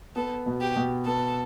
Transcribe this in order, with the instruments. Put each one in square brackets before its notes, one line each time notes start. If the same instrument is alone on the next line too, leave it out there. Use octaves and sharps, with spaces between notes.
[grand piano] B3 [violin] A4
[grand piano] B2
[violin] G4
[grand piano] B2
[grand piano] B3 [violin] A4